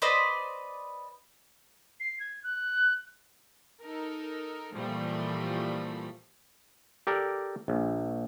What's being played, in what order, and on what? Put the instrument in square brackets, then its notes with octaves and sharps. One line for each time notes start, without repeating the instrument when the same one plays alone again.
[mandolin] B4 C5 D5 D#5
[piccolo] C7
G#6
F#6
[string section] D#4 A4 A#4
A#2 E3 F3 G3 A3
[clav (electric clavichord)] G4 A4 A#4 D5
A#1